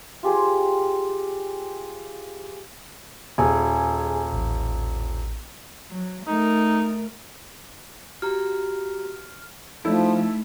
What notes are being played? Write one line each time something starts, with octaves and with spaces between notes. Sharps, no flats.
F4 G4 G#4 C5
D#1 G#4 G#5
A1
F#3
A3 D#4 A#4
F#4 G4 A#5 F6
F3 A3 D#4 E4 A4